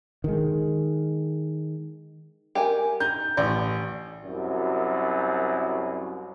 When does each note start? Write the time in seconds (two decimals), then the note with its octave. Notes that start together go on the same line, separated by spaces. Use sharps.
0.24 D#3 G#3
2.55 G4 A#4 G#5
3.00 D#4 G6
3.37 A1 D5
4.25 C2 F#2